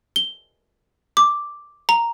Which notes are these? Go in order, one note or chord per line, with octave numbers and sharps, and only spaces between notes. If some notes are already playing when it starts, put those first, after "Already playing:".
G7
D6
A#5